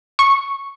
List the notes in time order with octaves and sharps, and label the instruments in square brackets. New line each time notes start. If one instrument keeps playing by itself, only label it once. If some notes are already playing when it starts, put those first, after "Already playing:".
[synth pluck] C#6